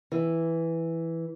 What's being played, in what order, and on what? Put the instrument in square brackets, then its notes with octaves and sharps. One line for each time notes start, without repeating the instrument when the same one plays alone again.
[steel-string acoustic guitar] E3